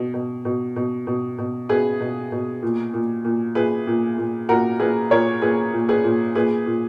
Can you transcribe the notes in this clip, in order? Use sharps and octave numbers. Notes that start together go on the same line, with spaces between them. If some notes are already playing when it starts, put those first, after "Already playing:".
Already playing: B2
B2
B2
B2
B2
B2
B2 G#4 B4
B2
B2
A#2
A#2
A#2
A#2 G#4 B4
A#2
A#2
A#2 F#4 A#4
A#2 G#4 B4
A#2 A#4 C#5
A#2 G#4 B4
A#2
G#4 B4
A#2
A#2 G#4 B4
A#2